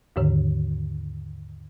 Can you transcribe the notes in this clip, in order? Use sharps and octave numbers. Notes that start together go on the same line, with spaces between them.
D#2 G#2 D3 D#3